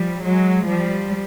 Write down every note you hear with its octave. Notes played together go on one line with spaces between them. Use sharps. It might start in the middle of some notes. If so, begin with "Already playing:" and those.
Already playing: F3 G3
F#3 G#3
F3 G3